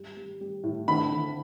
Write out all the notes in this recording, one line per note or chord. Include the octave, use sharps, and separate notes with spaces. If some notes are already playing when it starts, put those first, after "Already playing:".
Already playing: G3
G3
G3
A2
D3 B5
D3